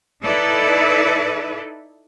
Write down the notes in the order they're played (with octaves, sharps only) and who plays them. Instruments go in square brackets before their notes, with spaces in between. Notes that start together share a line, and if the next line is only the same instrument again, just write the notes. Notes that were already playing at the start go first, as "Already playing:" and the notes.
[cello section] D#4 E4 A4 B4 D5 E5